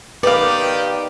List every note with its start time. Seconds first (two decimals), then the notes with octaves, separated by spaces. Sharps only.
0.23 D#3 G4 B4 D5 F5